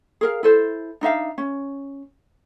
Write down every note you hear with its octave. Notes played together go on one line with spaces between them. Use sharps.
G#4 A#4 F5
E4 A4 C5
D4 D#4 E5 F5
C#4